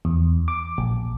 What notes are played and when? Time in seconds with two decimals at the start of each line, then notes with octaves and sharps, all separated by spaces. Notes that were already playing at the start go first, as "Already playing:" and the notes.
0.05 E2
0.48 D6
0.78 A#1